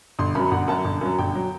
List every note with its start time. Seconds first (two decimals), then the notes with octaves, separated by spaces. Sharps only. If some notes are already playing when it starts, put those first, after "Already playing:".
0.19 G1 C6
0.35 F#2 F#3 B5
0.51 G1 F#5
0.68 F#2 F#3 A5
0.85 G1
1.01 F#2 F#3
1.18 G1 G5
1.35 F#3